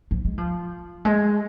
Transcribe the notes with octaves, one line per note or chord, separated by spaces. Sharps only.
F3
G#3
F3
G#3